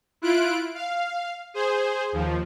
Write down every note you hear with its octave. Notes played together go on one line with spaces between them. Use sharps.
E4 F4 F#6 D7
F5
G#4 C5
D#2 F3